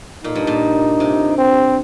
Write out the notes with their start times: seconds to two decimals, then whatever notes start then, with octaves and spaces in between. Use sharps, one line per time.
0.24 A#2 D#4
0.35 G2
0.47 A#2
1.00 C3
1.38 C4